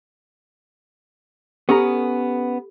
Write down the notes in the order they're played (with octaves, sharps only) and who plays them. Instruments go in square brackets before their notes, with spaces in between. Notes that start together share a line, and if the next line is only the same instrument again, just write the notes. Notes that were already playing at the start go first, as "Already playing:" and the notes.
[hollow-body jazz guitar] B3 C#4 A#5 [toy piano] G4 A4